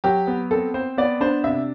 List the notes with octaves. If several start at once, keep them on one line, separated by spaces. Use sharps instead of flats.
F#3 G4
B3
C4 A4
C4 C5
B3 D5
D4 C5
C3 E5